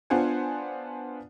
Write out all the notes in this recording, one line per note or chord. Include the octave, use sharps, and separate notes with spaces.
B3 D4 F4 C5 F#5 G#5